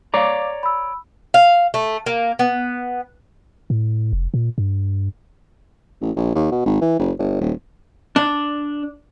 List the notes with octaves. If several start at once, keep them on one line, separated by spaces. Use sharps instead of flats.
C#5 D5 F5 A#5 D6
B5 E6
F5
A3
A#3
B3
A2
F1
A#2
G2
A1
A#1
D#2
B2
G#1
E3
F#1
G1
D#1
D4